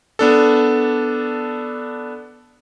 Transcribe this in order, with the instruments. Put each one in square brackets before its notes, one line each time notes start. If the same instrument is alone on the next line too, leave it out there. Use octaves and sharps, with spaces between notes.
[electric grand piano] B3 D4 A4